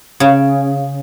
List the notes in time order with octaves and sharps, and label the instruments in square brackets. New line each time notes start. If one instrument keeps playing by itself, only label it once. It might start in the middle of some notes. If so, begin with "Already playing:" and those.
[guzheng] C#3